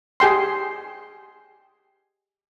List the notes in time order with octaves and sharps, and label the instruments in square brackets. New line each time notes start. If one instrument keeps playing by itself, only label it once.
[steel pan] G4 G#4 G5 C6